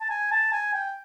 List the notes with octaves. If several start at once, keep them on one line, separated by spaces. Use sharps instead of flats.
A5
G#5
A5
G#5
G5